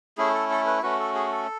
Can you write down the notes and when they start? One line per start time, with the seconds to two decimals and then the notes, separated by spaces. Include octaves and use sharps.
0.18 A3 C#4 E4 G#4
0.34 A4
0.50 A4
0.66 B4
0.83 A3 C#4 F#4 B4
0.99 A4
1.15 G#4
1.32 A4